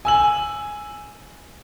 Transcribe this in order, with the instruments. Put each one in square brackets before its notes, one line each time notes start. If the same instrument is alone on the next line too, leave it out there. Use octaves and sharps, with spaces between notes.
[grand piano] G#5 E6 F#7